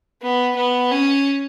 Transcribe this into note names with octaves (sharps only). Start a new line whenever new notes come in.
B3
B3
C#4